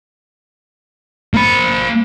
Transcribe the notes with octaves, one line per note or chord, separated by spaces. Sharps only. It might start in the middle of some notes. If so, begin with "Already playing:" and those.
A#3 B5